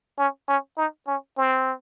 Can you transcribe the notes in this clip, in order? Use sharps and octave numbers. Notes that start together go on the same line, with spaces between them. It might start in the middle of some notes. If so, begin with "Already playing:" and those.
C#4
C#4
D#4
C#4
C4